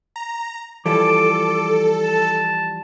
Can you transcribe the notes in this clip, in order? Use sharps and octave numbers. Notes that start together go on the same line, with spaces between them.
A#5
E3 F3 G3 A4 D6
A5